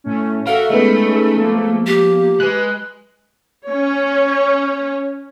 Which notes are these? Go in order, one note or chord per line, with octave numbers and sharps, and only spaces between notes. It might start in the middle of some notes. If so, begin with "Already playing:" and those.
A2 A3 C#4
F#4 A4 A#4 E5 F5
G#3 A3 B3 C#4 D#4 B5
F3 A#3
G4
G#3 B4 F#6
C#4 C#5